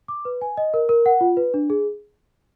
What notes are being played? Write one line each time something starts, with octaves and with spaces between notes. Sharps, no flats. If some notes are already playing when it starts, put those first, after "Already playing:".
D6
B4
G#5
D#5
A#4
A#4
F#5
F4
B4
D4
G#4